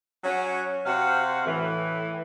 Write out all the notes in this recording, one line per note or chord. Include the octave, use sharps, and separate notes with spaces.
F#3 C#4 F#5
C3 F#4 C5 F5 F#5
A2 E3